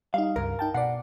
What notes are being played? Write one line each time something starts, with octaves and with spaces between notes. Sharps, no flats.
G3 D#4 F5
C#2 G2 A#4
D#4 G5 A5
B2 B3 D5 F#5